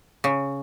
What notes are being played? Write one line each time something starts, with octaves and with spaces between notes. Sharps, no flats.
C#3